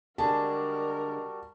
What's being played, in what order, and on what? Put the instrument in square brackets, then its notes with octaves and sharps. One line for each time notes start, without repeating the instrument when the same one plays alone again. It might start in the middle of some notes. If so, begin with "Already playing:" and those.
[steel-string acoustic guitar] D3 G#3 G#4 [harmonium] G3 F#4 [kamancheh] A#4 [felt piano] A5